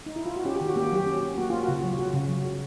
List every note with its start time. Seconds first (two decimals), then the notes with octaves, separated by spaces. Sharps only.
0.06 D#4
0.16 E4
0.26 F4
0.36 F#4
0.45 C#4 G4
0.56 G4
0.61 D#3
0.66 F#4
0.76 A#3 G4
0.86 F#4
0.92 F#3 G4
1.06 C#4
1.22 C#4
1.37 A#3 F#4
1.50 A#3 F4
1.63 C#3 F#4
1.84 F#3
1.99 C#3 F#4
2.14 C#3
2.29 F#3
2.45 C#3